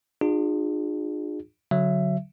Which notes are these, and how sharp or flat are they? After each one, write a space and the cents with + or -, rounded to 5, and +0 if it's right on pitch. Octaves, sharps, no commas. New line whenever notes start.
D4 +45 F4 +25 G#4 -15
D3 -30 F#3 +0 E5 +20